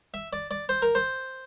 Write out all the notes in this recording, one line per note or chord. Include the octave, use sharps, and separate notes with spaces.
E5
D5
D5
C5
A#4
C5